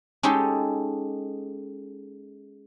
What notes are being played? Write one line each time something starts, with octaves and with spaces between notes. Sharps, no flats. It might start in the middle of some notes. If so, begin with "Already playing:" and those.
G#3 C#4 D#4 G4 A4